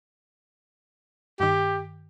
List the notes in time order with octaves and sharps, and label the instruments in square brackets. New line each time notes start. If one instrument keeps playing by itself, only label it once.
[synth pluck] G2 D#3 [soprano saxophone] G4